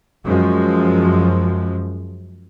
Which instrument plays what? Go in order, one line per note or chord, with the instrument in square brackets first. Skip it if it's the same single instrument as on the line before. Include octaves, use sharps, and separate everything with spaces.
[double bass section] F#2 F3 G#3